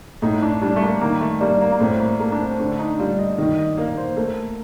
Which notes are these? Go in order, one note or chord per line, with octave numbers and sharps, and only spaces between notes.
A2 D#4
D4
G3 D4
A3
A#3
D#3 A#3
A3
G3 A#3
A#3
A#3
A2 C4
A#3
A3 A#3
D4
C4
D3 D4
D#4
G3 F4
D#5
D#3 D#5
D#5
A#3 D5
C5
A3 A#4